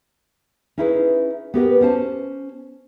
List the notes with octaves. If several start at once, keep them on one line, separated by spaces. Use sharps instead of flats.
C#4 D#4 E4 G#4 B4
B3 G4 A#4 B4
C#4 C5 A5